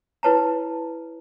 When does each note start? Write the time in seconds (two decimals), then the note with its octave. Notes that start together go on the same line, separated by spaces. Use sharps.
0.23 E4 B4 C#5 A5 A#5